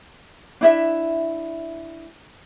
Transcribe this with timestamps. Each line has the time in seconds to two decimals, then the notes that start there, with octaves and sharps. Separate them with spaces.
0.61 D4 E4 E5